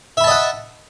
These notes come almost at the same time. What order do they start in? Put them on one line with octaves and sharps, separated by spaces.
E5 B5 A5 D#5 F#5